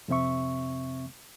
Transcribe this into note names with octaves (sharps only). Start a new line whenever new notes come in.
F2 C3 C4 E5 C#6